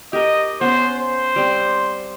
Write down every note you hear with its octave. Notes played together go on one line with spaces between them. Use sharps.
G4 A#4 D#5
B3 C#4 C5
C5
G3 C4